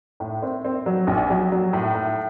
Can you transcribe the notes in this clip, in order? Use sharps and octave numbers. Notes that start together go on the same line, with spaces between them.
A2
C4
C4
F#3
A#1
F#3
F#3
A2
A2